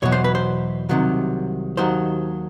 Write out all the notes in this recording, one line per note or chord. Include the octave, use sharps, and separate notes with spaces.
E2 B2 F#3 C#5
C5
B4
C5
C2 C3 D#3 F#3
D#2 D#3 F#3 C5